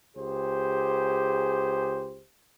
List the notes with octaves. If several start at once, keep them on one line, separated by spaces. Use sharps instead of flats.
C#2 G4 G#4 C5